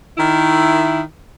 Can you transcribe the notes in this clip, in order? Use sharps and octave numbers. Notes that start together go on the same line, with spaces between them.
D#3 E4